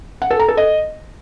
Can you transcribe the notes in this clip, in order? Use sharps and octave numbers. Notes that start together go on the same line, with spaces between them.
F#5
A4
A#5
A4
D#5